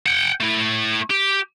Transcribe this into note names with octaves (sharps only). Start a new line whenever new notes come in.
F#5 G5
A3 E4
G4